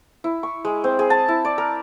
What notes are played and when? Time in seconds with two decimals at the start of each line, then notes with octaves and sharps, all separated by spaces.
0.24 E4
0.43 C#6
0.65 G#3
0.84 C4
0.99 G#4
1.10 A5
1.28 E4
1.45 D5
1.58 A#4